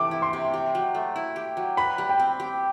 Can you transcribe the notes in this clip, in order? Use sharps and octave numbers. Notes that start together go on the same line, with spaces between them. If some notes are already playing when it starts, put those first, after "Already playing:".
Already playing: C3 E3 A3 D6
E4
C6
C3
G4
F#3
A3
E4
G4
F#3
B4 B5
G3
G5
C4
G4